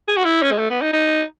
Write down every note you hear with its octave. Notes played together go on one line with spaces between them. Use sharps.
G#4
F#4
E4
C#4
G#3
A3
B3
D#4
D#4